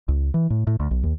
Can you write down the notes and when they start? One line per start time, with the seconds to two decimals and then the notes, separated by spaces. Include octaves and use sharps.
0.08 C#2
0.34 E3
0.50 A2
0.67 A2
0.80 D2
0.91 B1
1.03 D#2